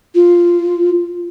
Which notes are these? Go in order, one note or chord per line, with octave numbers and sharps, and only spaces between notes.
F4